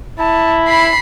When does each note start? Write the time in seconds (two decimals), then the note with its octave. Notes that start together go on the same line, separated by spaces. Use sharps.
0.19 E4 A5
0.68 B5 C7